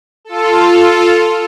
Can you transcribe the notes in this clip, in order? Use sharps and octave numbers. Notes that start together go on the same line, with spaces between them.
F4 A4